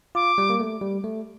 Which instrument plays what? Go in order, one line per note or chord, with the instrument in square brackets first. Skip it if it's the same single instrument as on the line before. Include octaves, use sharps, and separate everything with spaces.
[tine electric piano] F4 [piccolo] D6
[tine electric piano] G3
A#3
A3
G3
A3